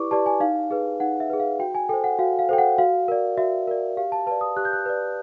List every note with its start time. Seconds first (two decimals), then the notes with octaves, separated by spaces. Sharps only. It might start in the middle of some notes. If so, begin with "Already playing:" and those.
Already playing: E4 G4 B4 D5 C#6 D6
0.11 G4 B4 D5 A5
0.26 G#5
0.40 D#4 F5
0.71 G#4 B4
1.00 D#4 F#5
1.20 E5
1.30 G#4 B4
1.40 F5
1.59 F#4 G5
1.75 G#5
1.89 A4 C5 G5
2.04 F#5
2.19 F#4 F5
2.39 F5
2.49 A4 C5 G5
2.58 F#5
2.78 F#4 F5
3.08 A#4 D5
3.37 F#4 E5
3.67 A#4 D5
3.97 G4 F5
4.12 A5
4.27 B4 D5 A5
4.41 D#6
4.57 G4 F#6
4.65 G6
4.73 F#6
4.86 B4 D5